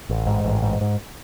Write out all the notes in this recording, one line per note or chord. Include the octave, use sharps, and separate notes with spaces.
A1
G#2
A1
G#2
G#2